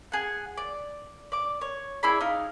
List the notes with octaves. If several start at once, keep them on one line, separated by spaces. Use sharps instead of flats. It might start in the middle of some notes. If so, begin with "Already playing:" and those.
G#4 F#5
D5
D5 D6
C#5
E4 G#4 D5 B5
D#4 F5